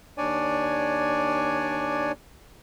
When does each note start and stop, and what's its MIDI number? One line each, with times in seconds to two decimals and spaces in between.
0.18 2.12 39
0.18 2.12 62
0.18 2.12 73
0.18 2.12 74
0.18 2.12 80